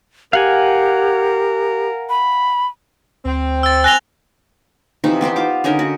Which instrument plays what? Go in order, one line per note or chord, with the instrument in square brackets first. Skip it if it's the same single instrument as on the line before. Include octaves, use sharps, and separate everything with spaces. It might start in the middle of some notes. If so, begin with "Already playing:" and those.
[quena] G4 [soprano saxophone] A#4 [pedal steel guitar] F5 F#5 G#5
[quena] B5
[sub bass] D2 [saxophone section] C4
[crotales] E6 A6
[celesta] G#5 A#6 G7 [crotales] F#6 F7
[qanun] C3 E3 F3 D#4
B3 G4 C5 G5
F4 D6
D3 C#4 D#4 A#4
F#4